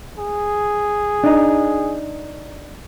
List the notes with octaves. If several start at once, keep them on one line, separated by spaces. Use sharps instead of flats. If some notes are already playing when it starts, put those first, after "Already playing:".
G#4
D4 D#4